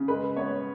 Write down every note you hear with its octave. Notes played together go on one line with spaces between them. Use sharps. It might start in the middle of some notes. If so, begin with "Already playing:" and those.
Already playing: C#3
G#3 B4
B3 C#5